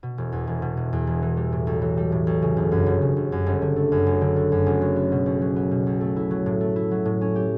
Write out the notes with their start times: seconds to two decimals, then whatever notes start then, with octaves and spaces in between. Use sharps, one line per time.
0.03 B2
0.18 E1
0.32 E2
0.47 E1
0.62 B2
0.77 E1
0.93 E2
1.07 E1
1.22 E3
1.37 G3
1.52 A2
1.67 B1
1.82 E3
1.97 G3
2.12 A2
2.27 B1
2.42 C#3
2.57 G1
2.72 F#2
2.86 G1
3.02 C#3
3.16 G1
3.32 F#2
3.46 G1
3.62 D3
3.76 A3
3.92 F#2
4.07 F#1
4.21 D3
4.36 A3
4.52 F#2
4.66 F#1
4.81 F#3
4.96 B3
5.12 B2
5.26 B1
5.41 F#3
5.56 B3
5.71 B2
5.87 B1
6.01 A3
6.16 E4
6.31 F#3
6.46 A2
6.61 A3
6.76 E4
6.91 F#3
7.06 A2
7.21 C#4
7.36 G4